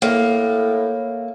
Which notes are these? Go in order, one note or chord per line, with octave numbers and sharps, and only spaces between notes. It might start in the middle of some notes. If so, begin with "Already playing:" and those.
A2 A#3